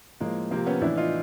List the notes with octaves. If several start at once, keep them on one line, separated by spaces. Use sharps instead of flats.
A2 F3 G#3 A#3
C3 F3 A#3 C4
B3 C#4
A2 E3 D4 E4
D#4 F4